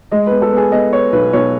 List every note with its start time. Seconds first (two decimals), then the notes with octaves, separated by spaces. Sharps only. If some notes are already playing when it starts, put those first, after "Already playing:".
0.12 G#3 D#5
0.27 B4
0.31 B3
0.42 A4
0.52 B3 G#4
0.72 B3 D#5
0.92 B3 C#5
1.12 B1 B4
1.33 B1 C#5